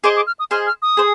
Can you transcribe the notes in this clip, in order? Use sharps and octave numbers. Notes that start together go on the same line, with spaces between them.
G#4 C5 D#5 D6
D6
F6
D#6
G#4 C5 D#5 F6
F6
D#6
G#4 C5